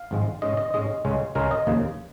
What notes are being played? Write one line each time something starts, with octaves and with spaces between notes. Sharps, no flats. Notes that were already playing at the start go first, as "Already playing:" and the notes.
Already playing: F5
G#1 G#2 F3 G#3
G#2 G#3 C#4 D#5
D#5
G#2 G#3 C#4 D#5
C#2 C#3 G#3 C#4
C#2 C#3 G#3 C#4 A#4
D#5
D#2 C#3 F3 A#3